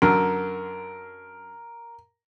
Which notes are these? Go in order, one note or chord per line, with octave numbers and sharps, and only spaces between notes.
F#2 D3 A#4